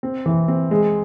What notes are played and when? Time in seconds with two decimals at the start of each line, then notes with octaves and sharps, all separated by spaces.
0.03 C4
0.26 E3
0.48 C4
0.71 G#3